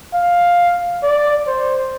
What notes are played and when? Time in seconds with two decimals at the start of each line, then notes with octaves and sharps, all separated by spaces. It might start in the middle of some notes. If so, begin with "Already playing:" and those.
0.14 F5
1.03 D5
1.47 C5